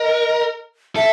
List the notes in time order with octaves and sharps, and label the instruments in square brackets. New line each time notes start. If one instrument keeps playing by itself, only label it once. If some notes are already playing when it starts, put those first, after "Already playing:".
Already playing: [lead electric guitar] A#4 [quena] D#5
[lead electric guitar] A4 [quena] E5